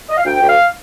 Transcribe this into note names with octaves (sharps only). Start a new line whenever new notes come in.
D#5
F5
D2 G5
D2
F5